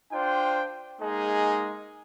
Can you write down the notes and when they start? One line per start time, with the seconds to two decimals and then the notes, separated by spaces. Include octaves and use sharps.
0.12 D4 F4 C5 G5
1.01 G#3 A#3 D#4 G#4